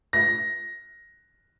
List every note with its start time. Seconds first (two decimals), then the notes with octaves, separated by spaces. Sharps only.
0.13 A#6